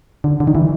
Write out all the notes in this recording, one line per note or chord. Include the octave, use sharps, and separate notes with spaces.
D3
D3
D#3
E3